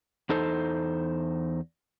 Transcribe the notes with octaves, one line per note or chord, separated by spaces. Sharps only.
E2 D#4 A4 C5